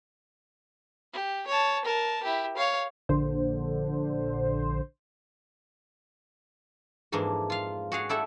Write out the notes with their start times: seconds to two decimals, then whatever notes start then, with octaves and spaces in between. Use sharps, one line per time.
1.13 G4
1.47 C#5 A5
1.85 A#4 A5
2.23 E4 G4
2.57 C#5 F5
3.09 A#1 D3 C5
7.12 F2 G#2 E3 A#3 D4
7.50 F4 F5
7.92 F#4 G#4 F5 F#5
8.09 E4 G4 A4 D5 E5 F#5